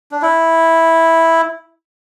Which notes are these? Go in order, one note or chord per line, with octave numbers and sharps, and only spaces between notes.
D4
E4